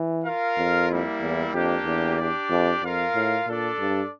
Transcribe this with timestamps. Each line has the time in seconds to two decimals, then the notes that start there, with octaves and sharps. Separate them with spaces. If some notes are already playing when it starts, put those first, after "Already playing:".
Already playing: E3
0.24 F4 A#4 F5
0.57 F2
0.89 G3 A#3 E4
1.21 E2
1.53 F2 A#3 D4 G4
1.85 E2
2.17 D4 G4 D5
2.50 F2
2.82 F2 F4 A#4 F5
3.15 A2
3.47 A#2 D4 A4 D5
3.79 G2